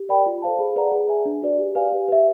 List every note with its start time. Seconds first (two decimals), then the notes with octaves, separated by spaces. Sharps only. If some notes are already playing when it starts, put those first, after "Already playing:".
Already playing: G4
0.09 A#4 D5 G5 B5
0.26 F4
0.42 A4 C5 F5 A5
0.59 G#4
0.76 B4 D5 F#5 A#5
0.92 G#4
1.08 B4 E5 G#5
1.25 D4
1.42 F#4 B4 D5
1.58 G4
1.75 B4 D5 F5 G#5
1.92 G4
2.08 B4 E5